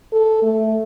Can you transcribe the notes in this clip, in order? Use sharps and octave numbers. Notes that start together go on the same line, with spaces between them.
A4
A3